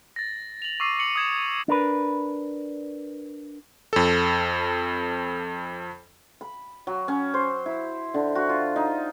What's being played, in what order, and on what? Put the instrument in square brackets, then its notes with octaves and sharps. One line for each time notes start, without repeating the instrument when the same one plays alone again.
[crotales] A6 A#6
F7 F#7
C#6 D6 E6 C7 D#7
D6 C#7 F#7
D#6 G#6 E7
G#6
[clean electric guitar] D4 A#4 B4
[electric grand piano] F2 A4
[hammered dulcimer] B5
F#3
C#4
C5
E4
D3
F#4
F4
D#4